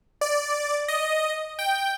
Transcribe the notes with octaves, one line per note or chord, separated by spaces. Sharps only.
D5
D#5
G5